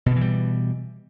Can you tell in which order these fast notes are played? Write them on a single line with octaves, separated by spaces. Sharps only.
B2 D3 E3 G3